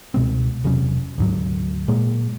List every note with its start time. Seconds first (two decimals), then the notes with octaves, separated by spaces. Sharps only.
0.14 C#2 B2 G#3 C4
0.64 E1 C3 F#3 C#4
1.18 D2 G#2 F#3
1.88 A#2 G#3 A#3